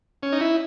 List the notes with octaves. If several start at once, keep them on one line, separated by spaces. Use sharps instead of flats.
C#4
D#4
E4